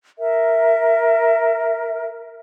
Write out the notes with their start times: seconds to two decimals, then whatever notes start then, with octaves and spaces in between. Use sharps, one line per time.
0.18 A#4 E5